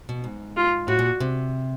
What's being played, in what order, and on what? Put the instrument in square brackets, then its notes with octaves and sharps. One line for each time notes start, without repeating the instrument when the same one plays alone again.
[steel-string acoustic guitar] B2
G#2
[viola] F4
[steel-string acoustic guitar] A2 [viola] F#4
[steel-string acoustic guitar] A#2
C3